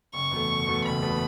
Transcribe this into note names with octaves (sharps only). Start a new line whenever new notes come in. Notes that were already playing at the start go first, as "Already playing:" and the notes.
F#1 C#6
E2 B2 A3
F#1
E2 B2 A3
F#1 B5
E2 B2 A3